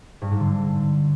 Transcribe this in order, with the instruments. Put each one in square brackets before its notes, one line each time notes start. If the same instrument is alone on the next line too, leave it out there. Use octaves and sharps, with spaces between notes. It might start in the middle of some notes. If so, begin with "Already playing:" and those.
[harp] G2
G#2
D3